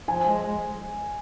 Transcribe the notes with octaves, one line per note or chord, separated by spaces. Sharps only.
F3 G#5
G#3
G#3